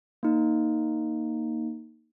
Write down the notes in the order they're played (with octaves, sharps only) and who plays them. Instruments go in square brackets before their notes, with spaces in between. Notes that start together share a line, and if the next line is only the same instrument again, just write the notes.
[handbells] A#3 D#4